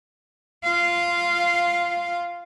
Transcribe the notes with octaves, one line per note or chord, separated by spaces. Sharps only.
F4 F5